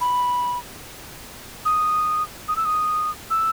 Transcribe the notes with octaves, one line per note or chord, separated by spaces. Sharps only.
B5
D#6
D#6
E6
D#6
E6